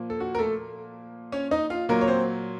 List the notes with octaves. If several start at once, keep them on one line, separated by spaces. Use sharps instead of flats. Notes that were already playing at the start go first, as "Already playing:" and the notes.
Already playing: A#2 F3 A#3
A4
F#4
A#4
A3 A4
C#4 C#5
D#4 D#5
F4 F5
A#2 F#3 A#3 A#4
C#5
C4 C5